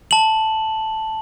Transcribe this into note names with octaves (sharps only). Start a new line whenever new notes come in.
A5 F#7